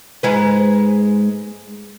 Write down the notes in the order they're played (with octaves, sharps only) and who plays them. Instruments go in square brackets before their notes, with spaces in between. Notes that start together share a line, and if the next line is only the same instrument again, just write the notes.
[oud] G#2 G#3 B4